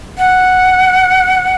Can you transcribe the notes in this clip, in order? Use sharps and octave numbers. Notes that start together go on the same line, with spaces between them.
F#5